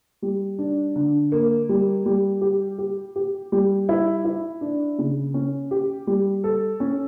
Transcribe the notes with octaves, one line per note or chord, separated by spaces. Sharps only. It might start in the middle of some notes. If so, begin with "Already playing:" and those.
G3
D4
D3
A#3
G3
G3
G4
G4
G4
G3
E4
E4
D4
C#3
C#4
G4
G3
A4
C#4